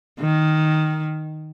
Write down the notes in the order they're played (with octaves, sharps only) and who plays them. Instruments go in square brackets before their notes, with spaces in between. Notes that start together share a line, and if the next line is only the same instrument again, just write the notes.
[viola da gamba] D#3